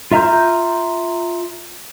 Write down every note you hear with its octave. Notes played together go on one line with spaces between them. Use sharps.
F4 E5 A#5 F6 G6